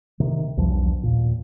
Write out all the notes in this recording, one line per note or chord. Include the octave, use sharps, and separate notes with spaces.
C3 D#3
B1 E2 G2 F3
D#2 A#2